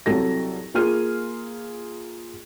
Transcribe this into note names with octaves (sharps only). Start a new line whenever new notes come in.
C2 F#3 A4 A#6
A#3 F4 G#4 F6 D#7